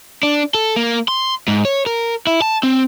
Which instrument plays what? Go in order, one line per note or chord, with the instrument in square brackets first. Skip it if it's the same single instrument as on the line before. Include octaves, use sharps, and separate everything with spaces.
[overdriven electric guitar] D4
A4
A#3
C6
G#2
C#5
A#4
E4
A5
C4